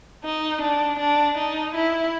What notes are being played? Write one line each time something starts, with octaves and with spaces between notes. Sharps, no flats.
D#4
D4
D4
D#4
E4